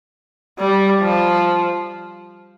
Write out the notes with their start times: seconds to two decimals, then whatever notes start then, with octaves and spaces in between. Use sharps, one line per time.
0.59 G3
1.01 F3